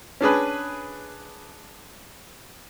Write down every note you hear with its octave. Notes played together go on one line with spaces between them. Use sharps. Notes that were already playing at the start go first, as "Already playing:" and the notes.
C#4 D4 G#4 B4